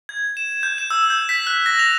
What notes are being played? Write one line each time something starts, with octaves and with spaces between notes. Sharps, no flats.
G#6
E7
G6
E7
E6
G6
B6
F#6
A#6
F7